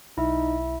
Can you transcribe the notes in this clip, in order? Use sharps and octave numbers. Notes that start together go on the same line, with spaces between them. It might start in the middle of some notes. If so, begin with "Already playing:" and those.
B1 D#4 E4 E5